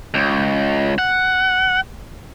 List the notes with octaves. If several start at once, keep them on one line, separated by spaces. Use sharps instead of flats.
C#2
F#5